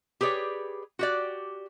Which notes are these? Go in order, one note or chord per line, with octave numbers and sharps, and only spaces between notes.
G4 G#4 B4 C#5 D5
F#4 G4 D5